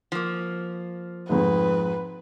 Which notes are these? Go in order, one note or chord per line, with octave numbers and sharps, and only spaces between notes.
F3 A#3
F2 G#2 B4